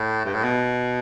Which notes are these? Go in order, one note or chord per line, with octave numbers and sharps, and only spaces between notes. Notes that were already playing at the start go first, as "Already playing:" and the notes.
Already playing: A2
G2
A2
B2